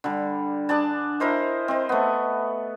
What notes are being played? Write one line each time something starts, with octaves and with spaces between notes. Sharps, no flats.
D3 G3
D4 G#4 D5 A5
E4 A#4 C5 D#5
C4 D#5
A3 B3